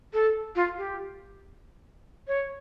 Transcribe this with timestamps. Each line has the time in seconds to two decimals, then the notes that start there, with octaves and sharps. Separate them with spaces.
0.13 A4
0.55 F4
0.78 G4
2.28 C#5